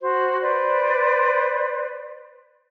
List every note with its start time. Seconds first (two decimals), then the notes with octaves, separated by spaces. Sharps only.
0.01 F#4 C5
0.40 B4 C5 D5